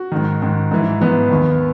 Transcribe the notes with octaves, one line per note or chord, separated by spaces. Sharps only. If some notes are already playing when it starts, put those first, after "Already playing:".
Already playing: F#4
G#2 D#3
G#2 D#3
G#2 E3
G#2 E3 B3
D#2 D#3